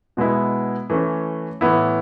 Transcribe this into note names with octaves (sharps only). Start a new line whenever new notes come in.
B2 G#3 B3 E4
E3 A3 C#4
A2 E3 B3 E4